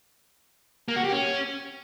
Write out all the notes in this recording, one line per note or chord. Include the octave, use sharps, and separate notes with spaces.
A#3
F#4
G4
C#4